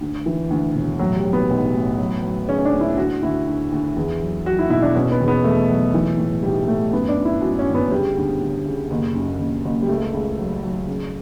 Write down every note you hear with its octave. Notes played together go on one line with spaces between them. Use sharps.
D2
E3
D2
E1
A2 F#3
G3
F#3
B3
B1
A2
F#3
F#3
C#3 C#4
C#4
D4
D2
E4
D2 F#4
D2 E4
D2
D2
E2
F#3
F#3 F#4
E4
B2 E4
D4
B2 C#4
B3
E2
B3
E2 A3
F#3
E3
A2
B1 G3
A2 A3
F#2 B3
D4
F#2
E4
F#2 F#4
C#4
G1
B3
C#3 G3
D2
D2
C#3
F#1
F#2
F#1
F#1
G3
C#2 A3
C#2
F#3
F#3
C#3